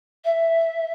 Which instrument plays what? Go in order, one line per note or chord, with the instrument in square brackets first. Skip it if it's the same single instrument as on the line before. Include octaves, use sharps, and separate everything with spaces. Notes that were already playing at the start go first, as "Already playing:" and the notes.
[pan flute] E5